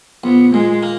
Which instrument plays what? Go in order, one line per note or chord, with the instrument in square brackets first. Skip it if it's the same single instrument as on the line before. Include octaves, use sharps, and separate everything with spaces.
[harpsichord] A#1 [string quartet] B3
[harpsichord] A#2 [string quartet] G#3
[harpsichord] A#3